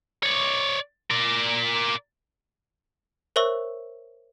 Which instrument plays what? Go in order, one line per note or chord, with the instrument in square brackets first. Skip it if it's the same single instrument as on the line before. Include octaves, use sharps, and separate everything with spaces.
[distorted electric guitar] C#5 D5
A#4 D5
[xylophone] A#4 C5 C#5 E5 C#6 E6